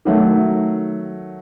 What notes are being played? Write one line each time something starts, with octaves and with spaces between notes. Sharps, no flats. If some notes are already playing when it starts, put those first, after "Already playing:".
D#3 F#3 A3